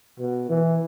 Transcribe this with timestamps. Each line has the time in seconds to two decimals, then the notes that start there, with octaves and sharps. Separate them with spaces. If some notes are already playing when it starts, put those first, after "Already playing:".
0.19 B2
0.49 E3